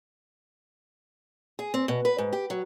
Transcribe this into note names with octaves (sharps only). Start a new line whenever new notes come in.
G#4
C4
B2
B4
G#2
G4
F#3